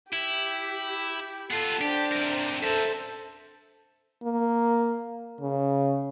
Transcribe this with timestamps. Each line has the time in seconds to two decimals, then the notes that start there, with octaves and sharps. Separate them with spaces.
0.13 E4 G4
1.50 B3 F4 A4
1.81 D4 G4 C5
2.12 C3 A#4
2.63 A4 A#4 C5 E5
4.23 A#3
5.41 C#3